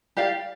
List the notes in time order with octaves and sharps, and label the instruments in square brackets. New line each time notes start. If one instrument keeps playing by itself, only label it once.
[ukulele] G4 D5 F5